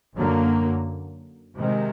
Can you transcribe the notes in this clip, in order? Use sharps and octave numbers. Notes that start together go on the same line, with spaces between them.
F#2 D3 F#3 A#3
C3 D#3 G#3